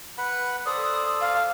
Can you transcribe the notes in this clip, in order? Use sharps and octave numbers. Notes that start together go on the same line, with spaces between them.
B4 F#5 B5
A4 C5 D5 D#6
F5